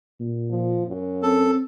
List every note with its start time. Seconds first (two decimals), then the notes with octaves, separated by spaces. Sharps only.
0.20 A#2
0.50 F3
0.87 F#2
1.23 C4 A4